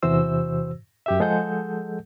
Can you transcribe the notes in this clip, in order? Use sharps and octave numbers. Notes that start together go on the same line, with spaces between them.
E2 C3 E3 F#4 C5 E6
F#2 G4 E5
F3 G#3 G#4 A4 F#5 G6